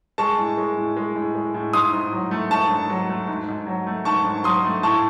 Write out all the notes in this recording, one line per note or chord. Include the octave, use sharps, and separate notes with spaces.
G#3 A5 C#6
A2
G#3
A2
G#3
A2
G#3
A2
G#2 C6 D#6
G#2
F#3
A3
G#2 A5 C#6
G#2
F#3
A3
G#2
G#2
F#3
A3
G#2 A5 C#6
G#2
F#3 C6 D#6
A3
A2 A5 C#6